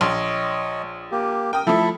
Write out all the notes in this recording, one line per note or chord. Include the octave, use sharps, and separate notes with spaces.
A#1 C#5 D#5 C6
A#3 G4
A#4 G5 D#6
F3 A3 E4 A4 E5